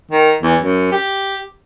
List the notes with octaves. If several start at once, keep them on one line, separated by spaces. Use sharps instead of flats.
D#3
E2
F#2
G4